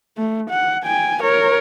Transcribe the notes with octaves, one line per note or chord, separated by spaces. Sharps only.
A3
F#5
G5 G#5
A#4 C#5